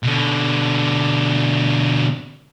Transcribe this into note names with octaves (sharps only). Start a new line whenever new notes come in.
B2 D3